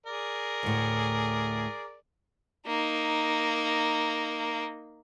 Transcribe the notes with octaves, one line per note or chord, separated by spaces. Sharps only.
G#4 A#4 D5
D2 A2
A#3 D#4